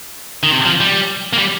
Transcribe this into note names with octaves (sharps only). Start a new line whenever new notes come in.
D#3
C3
F3
G3
A#3
G3